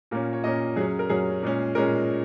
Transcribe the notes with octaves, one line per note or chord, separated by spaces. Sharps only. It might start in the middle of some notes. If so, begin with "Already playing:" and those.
A#2 A#3 C#4
C#5
A#2 A#3 C#4 D#5
F#2 F#3 C#4 G#4
A#4
F#2 F#3 C#4 G#4
A#2 G#3 C#4
A#2 G#3 C#4 A#4